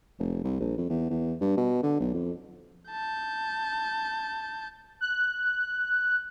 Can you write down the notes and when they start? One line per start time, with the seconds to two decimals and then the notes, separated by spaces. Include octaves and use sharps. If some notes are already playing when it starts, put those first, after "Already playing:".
0.19 F1
0.44 C2
0.60 A#1
0.77 F2
0.89 E2
1.10 E2
1.41 G2
1.57 B2
1.83 D3
2.00 B1
2.13 F2
2.91 A5 G6
5.01 F#6